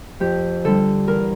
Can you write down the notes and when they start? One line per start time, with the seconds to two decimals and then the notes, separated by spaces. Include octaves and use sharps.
0.20 F2 G4
0.64 D3 G3 A4
1.08 E2 A#4